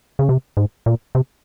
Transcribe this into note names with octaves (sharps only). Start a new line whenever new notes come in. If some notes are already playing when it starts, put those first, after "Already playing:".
C#3
C3
G#2
A#2
C3